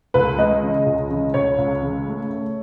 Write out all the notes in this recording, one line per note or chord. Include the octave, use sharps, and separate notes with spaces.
C#2 B4
G#3 D#5
C#3
C#2
C#3
C#2 C#5
C#2
C#3
A3
A3